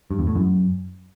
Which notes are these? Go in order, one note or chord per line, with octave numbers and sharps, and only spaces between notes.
G2
E2
A2
F#2